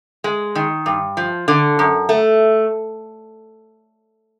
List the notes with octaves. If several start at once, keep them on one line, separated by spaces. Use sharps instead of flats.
G#3
D#3
G2
F3
D3
F#2
A3